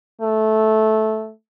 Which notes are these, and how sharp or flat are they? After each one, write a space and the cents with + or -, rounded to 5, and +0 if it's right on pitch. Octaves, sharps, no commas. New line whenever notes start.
A3 -10